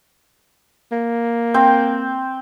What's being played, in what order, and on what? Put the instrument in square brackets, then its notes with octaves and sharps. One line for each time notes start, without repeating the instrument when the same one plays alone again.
[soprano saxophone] A#3
[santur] C4 G5